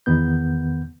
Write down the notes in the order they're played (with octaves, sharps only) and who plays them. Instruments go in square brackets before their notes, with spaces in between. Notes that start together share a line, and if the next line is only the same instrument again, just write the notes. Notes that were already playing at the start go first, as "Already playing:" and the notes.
[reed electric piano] E2 D#3 B3 G6